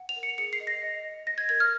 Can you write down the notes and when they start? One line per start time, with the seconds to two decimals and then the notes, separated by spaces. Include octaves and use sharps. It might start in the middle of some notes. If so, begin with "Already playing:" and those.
Already playing: F#5
0.09 F7
0.16 A#4
0.23 C#7
0.38 G#4 C#7
0.53 C7
0.60 D#5
0.67 A#6
0.83 D#5
1.05 D#5
1.27 D#5 A#6
1.38 G#6
1.49 A#4 G#6
1.60 F6